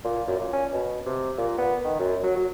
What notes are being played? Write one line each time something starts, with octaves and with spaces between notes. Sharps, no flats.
A#2
F#2
A#2
C#4
B2
C3
A#2
B3
D#3
F#2
F#3
F#3